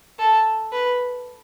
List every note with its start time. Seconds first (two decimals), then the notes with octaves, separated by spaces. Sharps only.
0.19 A4
0.72 B4